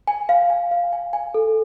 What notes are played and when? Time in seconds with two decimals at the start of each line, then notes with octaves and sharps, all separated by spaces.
0.07 G#5
0.29 F5
0.50 G#5
0.71 F5
0.93 G#5
1.13 G#5
1.34 A4